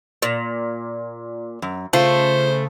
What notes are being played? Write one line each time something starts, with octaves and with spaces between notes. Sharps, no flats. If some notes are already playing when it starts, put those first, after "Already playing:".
A#2
F#2
C#3 A3 F4 C5